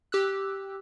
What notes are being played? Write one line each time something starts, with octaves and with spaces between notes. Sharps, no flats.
G4 E6 F#6